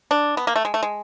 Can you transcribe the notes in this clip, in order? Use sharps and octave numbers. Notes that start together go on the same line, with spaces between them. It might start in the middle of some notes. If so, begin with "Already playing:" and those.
D4
B3
A#3
A3
G#3
A3
G#3